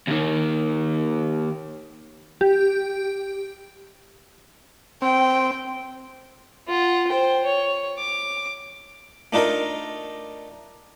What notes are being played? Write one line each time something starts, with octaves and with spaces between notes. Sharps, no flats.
D#2 D#3
G4
C4 G5
F4 F#5
C5 G5
C#5
D6
A3 D4 D#4 F4 A#4